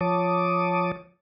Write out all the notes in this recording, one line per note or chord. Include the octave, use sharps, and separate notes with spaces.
F3 C#5 A5 D6 D#6